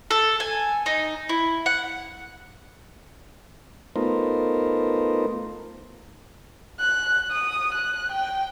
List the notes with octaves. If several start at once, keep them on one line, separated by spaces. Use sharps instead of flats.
A4
G#5
D#4
E4
F#5
A3 B3 D#4 F4 A#4 C5
F#6
D#6
F#6
G5